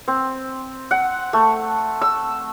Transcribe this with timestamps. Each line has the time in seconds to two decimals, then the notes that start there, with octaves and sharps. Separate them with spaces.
0.08 C4
0.91 F#5
1.33 A3
2.02 E6